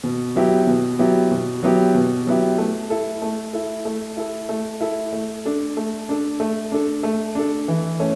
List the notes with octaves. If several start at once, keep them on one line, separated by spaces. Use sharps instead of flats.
B2
F#3 B3 E4 G4
B2
F#3 B3 E4 G4
B2
F#3 B3 E4 G4
B2
F#3 B3 E4 G4
A3
E4 A4
A3
E4 A4
A3
E4 A4
A3
E4 A4
A3
D4 A4
A3
D4 A4
A3
D4 A4
A3
D4 A4
E3
A3 C#4